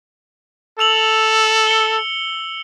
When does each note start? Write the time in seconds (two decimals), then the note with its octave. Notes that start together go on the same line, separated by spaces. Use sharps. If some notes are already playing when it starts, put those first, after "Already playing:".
0.79 A4 E6 F7 F#7
1.67 C#7 G7